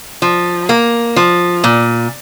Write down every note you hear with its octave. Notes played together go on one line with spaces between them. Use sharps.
F3
A#3
F3
A#2